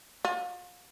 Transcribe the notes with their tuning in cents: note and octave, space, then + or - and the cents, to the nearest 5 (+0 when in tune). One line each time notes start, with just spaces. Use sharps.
F4 +40